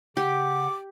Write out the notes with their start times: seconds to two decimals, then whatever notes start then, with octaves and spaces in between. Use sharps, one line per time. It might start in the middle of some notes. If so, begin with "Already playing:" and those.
0.17 C#3 G4 F#5 D6